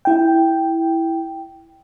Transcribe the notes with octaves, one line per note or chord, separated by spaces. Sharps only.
E4 G5